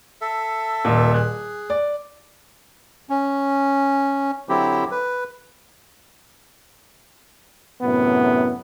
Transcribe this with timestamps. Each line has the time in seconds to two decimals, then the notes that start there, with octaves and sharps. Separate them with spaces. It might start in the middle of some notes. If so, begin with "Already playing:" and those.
0.21 A4 E5
0.85 D#1 A#2
1.14 G#4 F#6
1.70 D5
3.10 C#4
4.49 D3 F#3 C4 E4 G4
4.91 B4
7.82 F#2 A2 C3 B3